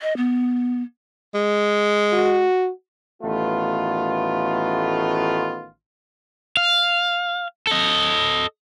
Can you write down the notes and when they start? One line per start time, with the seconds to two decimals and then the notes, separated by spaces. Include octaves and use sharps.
0.01 D#5
0.17 B3
1.35 G#3
2.13 F#4
3.22 A1 D#3 A3 B3 F4
6.57 F5
7.67 A4 D#5